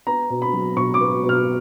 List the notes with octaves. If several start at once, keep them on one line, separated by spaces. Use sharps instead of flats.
B3 A#5
B2
B5
F#3
B2 C#6
D6
B3
B2
F6